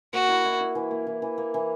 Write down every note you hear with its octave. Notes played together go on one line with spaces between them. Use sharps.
A#3 F#4
E4
E4
E4
E3
A#3
E3
E3
A#3
E3